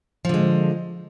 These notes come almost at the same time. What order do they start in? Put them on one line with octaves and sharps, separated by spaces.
F3 D3 G#3